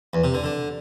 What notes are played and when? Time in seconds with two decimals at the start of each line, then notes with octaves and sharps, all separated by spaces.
0.13 E2
0.24 C3
0.34 D3
0.44 D3